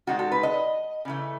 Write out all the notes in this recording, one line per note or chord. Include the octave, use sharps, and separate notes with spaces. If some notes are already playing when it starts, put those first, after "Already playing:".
D#3 G#3 F#4
A4
B4
D#5
C#3 E3 A3